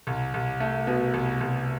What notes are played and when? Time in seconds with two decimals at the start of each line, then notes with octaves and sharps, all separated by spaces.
0.07 C2
0.34 C2
0.60 A3
0.87 B2
1.14 C2
1.41 C2